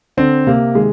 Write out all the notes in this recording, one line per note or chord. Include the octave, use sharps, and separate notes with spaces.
D3 C4
C3 A#3
D#3 G#3